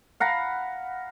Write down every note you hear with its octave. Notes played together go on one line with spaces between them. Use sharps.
F5 F#5 A#5 B5